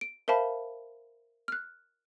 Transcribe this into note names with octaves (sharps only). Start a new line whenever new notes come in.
D7
A#4 C5 E5 F5 A5 B5
F6 F#6